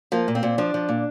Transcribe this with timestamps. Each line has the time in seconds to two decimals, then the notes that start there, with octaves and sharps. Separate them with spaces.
0.12 F3 A#3
0.28 A#2
0.35 C4
0.43 A#2
0.58 F3 D4
0.74 F3
0.89 A#2